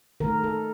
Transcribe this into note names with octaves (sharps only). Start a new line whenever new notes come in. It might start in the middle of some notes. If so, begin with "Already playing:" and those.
D#3 A3 A#4
A4